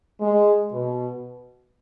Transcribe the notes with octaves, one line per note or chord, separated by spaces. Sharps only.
G#3
B2